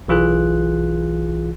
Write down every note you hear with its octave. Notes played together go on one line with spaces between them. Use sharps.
B1 E3 F4 G#4 F#6